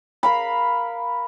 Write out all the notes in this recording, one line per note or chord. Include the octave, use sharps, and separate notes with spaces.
A#4 F5 B5